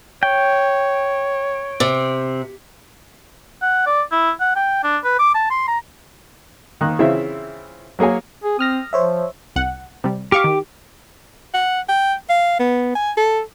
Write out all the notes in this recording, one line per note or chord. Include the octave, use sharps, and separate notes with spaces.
C#5 G5
C3
F#5
D5
E4
F#5
G5
D4
B4
D6
A5
C6
A#5
D#3 A#3 F#6
C#3 E3 C4 E4 F4 E5
F#3 A#3 G#4 C#5 G#5
G#4
C4 D#6 F6 A#6
F3 C5 C#5 E5
C2 F#5
C3 G3
G4 F5 C#6 D6 F6
D#3
F#5
G5
F5
B3
G#5
A4